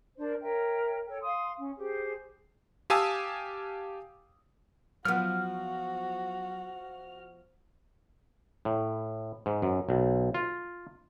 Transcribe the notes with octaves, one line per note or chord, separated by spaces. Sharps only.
D4 A#4 C5 D5
A#4 C#5 E5 G5
A4 C#5 G5
F5 C6 D#6
C#4
G4 G#4 C5
G4 F5 G#5 A5 D#6 E6
F3 F#3 B3 F#4 F6
A2
G#2
F#2
B1
F4